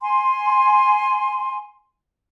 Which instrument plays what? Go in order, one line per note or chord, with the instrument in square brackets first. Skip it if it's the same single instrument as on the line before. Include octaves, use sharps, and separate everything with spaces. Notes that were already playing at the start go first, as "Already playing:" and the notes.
[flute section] G#5 C6